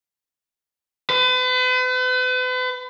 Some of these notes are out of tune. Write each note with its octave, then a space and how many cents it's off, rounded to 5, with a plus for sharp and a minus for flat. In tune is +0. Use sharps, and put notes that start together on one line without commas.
B4 +40